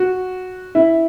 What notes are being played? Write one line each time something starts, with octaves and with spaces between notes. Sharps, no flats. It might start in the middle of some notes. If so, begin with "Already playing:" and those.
Already playing: F#4
E4